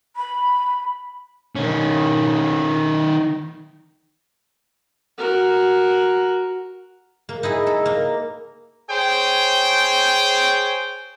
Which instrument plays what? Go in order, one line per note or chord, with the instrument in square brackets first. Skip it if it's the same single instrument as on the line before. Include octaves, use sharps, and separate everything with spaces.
[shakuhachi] B5
[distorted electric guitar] D#3 C#4
[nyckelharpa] F#4 A#4
[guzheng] A#3
D#4 E4 G#4
A4
A#3
[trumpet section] G#4 C5 C#5 G5